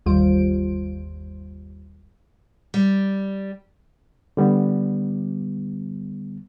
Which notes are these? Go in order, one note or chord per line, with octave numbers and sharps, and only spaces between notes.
G1 D#2 G3 F4 C5 D7
G3
D3 G3 B3